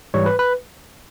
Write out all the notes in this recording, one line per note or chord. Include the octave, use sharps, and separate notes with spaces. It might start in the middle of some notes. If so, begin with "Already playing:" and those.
G#2 E3 G3 C#5
B4
B4